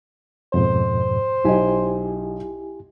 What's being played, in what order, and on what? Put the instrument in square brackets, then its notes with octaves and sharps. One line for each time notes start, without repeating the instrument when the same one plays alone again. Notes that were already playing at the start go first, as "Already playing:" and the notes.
[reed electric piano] F2 G#2 B2 [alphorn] C5
[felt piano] B1 D#5 [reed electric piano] E4 G4 G#5